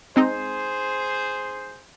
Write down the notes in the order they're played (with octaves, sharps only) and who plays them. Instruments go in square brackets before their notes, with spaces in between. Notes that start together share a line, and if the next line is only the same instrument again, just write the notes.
[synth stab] G#3 C4 D#4 [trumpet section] G#4 C5